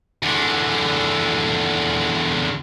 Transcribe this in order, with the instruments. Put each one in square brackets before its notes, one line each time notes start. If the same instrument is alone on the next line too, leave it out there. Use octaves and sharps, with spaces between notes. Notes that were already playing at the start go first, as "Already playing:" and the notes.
[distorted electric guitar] E2 D3